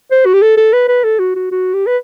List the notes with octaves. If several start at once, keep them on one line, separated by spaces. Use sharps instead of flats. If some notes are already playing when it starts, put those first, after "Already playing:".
C5
F#4
G4
A4
A4
B4
B4
A4
F#4
F#4
F#4
G4
B4